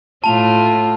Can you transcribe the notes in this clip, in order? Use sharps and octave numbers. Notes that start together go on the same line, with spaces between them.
A2 A3 F4 A5 F7